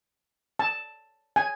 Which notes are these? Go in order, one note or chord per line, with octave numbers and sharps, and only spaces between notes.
A5
G#5